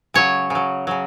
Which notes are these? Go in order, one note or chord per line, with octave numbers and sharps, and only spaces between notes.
C#3 F#3 C#5
C#3 F#3
C#3 F#3